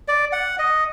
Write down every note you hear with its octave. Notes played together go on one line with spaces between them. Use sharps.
D5
F#5
D#5